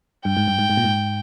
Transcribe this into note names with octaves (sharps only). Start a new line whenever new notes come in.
G2 G5
G#2
G2
G#2
G#2
A#2
G#2